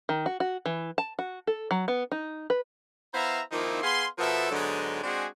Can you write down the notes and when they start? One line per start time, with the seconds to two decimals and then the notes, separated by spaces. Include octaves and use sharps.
0.09 D#3
0.26 F#4
0.40 F#4
0.66 E3
0.98 A5
1.19 F#4
1.47 A4
1.71 F#3
1.88 B3
2.12 D#4
2.50 B4
3.14 B3 E4 C5 E5 F5 A#5
3.52 D#3 F3 A#3 C4 D#4 E4
3.83 B3 G#4 F5 C6
4.19 B2 F3 B3 A4 A#4 E5
4.52 G#2 D3 F#3 G#3 B3 D#4
5.03 G#3 C4 D4 F#4 G#4